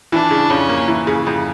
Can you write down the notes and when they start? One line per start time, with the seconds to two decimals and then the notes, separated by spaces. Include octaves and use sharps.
0.12 E3 D4
0.31 C#3
0.50 F2 C#4
0.69 A#3
0.88 E3
1.07 C#3
1.26 F2